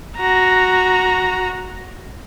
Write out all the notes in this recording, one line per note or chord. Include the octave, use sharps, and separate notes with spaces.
F#4 A#5